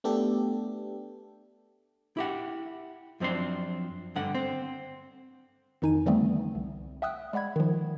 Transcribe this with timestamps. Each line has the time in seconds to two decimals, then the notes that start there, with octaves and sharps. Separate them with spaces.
0.04 A3 B3 D4 G4 A4
2.17 E4 G4 F#5
3.20 F#2 F3 C4 D4 C6
4.15 G2 D3 F#5
4.35 C4
5.82 F2 D#3 D#4 G#5 D#7
6.06 D3 E3 G3 A3 B3 C4
6.55 C2
7.02 E5 F#5 G5 D#6 E6 F#6
7.33 G#3 D5 F#5 B5 G#6
7.56 D#3 F3